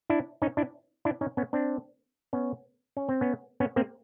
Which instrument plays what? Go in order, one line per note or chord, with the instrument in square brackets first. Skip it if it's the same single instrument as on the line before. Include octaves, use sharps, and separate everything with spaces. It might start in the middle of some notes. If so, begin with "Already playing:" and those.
[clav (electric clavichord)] D4 E4
C#4 D#4
D4 E4
D4 E4
C#4 D#4
B3 C#4
C4 D4
B3 C#4
C#4
C4
B3 C#4
B3 C#4
A#3 C4